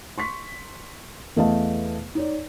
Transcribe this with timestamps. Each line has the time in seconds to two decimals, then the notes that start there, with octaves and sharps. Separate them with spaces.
0.18 C6 C#6 B6
1.36 E2 A3 B3 D#5 F5 A5
2.15 D#4 C#5 D5